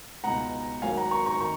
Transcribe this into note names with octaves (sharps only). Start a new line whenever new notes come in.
C#2 B2 G#3 D#4 F#5 A#5
G#1 G#2 F#3 A#3 F5 G#5
F#5 A#5
A#5 C#6
A#5 C#6
D#3 A#5 C#6